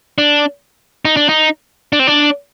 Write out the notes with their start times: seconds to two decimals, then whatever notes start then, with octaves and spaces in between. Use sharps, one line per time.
0.18 D4
1.05 D#4
1.17 D4
1.29 D#4
1.93 D4
1.99 C4
2.07 D4